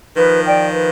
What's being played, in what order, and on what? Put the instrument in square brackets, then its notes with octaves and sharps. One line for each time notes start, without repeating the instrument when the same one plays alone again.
[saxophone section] D#3 F3 [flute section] B4
[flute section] D5 G5
B4